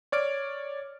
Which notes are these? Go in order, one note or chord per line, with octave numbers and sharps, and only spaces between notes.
C#5 D5 F6 D7